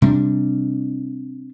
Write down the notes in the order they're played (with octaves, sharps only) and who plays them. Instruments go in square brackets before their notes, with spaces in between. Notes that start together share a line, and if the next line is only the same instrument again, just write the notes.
[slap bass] C3 G3 C4 D4